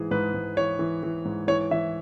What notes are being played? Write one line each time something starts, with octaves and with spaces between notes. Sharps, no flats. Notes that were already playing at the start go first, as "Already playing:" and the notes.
Already playing: G#2 E3 G#4
G#2 B4
G#2
E3 C#5
E3
E3
G#2
E3 C#5
E3 E5